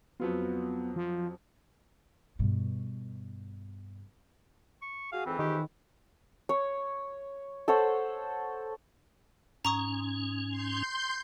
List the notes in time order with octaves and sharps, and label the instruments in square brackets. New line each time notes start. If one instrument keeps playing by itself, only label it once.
[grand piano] F2 F#3 F4 [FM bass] B3
[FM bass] F3
[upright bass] G2 B2
[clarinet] C#6
[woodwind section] F#4 G#4 [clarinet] F5
[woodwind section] F2 G#2 E3 [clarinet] C4
[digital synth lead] D#3 [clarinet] G4
[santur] C#5
A4 C5 C#5 F#5
[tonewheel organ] G#2 C#4 [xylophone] A#5 C#6 D#6
[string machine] C6 G6